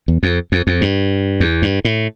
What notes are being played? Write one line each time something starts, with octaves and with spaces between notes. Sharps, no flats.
E2
F2
F2
F2
G2
E2
G2
A2